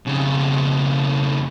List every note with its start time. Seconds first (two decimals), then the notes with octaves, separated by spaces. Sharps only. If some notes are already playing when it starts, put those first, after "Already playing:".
0.06 F2 C#3